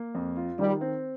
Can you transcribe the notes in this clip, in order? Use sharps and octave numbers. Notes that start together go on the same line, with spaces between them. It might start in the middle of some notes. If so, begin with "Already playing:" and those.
Already playing: A#3
F2
F4
D#3 G3
C4